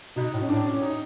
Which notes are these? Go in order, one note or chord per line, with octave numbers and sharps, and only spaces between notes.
B2 D#4
A2
C#4
A2 D4
C#4
D#4